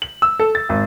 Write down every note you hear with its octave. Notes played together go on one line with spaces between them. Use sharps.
F#7
E6
A4
A6
G#1